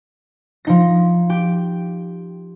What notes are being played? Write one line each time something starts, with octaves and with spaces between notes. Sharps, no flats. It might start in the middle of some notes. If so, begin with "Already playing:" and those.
F3 D#4 A#6
G4